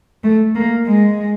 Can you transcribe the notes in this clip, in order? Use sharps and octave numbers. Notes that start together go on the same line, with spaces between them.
A3
A#3
G#3